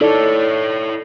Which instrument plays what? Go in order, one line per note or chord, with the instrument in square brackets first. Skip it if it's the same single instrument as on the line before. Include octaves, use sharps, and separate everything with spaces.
[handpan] D#4 A4 D5 [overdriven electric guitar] E4 C#5